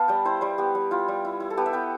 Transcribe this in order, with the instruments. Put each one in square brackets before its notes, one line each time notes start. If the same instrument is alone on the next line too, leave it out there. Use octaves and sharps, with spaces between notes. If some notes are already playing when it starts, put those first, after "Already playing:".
Already playing: [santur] B3 F5 A5
G3 G5
E4 C5
G3 C5
B3 G4
G3
E4 F4
G3
E4
E4
A4
B3 G4
E5
B3 G5